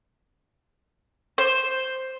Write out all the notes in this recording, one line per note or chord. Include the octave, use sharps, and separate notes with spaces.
C5